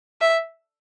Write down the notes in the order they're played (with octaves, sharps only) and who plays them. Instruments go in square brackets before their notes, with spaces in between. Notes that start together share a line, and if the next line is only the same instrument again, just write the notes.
[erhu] E5